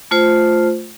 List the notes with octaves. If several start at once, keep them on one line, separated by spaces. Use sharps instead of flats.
A3 F4 C5